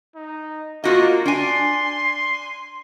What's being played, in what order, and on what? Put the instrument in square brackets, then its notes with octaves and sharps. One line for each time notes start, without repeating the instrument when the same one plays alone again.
[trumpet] D#4
[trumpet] A#3 [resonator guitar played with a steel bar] F4 F#4 D#5
[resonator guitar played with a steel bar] D4 G#5 [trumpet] C6